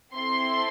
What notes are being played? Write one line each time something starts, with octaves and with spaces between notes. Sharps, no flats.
C4 E4 A4 C6